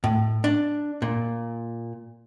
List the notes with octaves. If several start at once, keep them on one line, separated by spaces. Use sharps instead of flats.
A2
D4
A#2